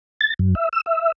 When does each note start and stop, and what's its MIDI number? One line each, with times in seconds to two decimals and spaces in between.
0.21 0.34 93
0.39 0.55 42
0.55 0.69 76
0.73 0.81 88
0.86 1.12 76